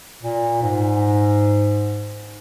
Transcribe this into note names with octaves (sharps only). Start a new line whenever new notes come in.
A#2
G#2